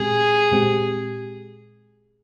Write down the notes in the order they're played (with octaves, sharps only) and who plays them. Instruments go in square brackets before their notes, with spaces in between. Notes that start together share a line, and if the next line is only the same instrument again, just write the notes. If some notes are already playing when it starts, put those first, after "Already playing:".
Already playing: [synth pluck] A#2 G#3 C4 G4 [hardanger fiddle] G#4
[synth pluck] A#2 G#3 C4 G4